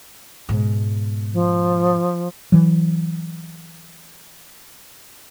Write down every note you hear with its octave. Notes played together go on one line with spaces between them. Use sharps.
G#2 B2
F3
E3 F#3